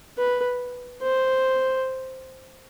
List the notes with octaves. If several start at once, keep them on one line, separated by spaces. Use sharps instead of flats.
B4
C5